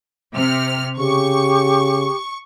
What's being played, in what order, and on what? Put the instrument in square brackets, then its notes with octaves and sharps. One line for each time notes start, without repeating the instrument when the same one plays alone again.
[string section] C3 F6
[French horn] C#3 [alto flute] G4 [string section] C#6